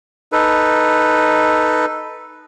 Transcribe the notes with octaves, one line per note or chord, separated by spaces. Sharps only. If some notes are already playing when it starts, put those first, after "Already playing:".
D#4 A4 B4